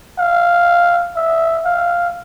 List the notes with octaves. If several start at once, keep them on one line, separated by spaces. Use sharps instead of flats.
F5
E5
F5